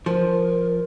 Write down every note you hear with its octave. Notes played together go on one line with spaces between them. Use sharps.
F3 A#4